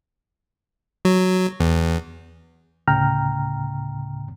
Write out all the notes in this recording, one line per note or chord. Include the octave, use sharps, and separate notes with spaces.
F#3
E2
D2 A2 C#3 G5 A#5 F6